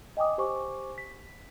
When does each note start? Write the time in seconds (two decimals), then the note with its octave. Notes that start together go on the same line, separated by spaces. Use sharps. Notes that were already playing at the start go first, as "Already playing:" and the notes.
0.17 D#5 G5 G#5 D6 D#6
0.38 G4 C5 G#5 C#6 D6
0.98 B6